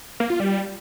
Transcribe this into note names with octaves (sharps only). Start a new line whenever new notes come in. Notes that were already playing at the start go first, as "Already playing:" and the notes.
A#3
F4
G3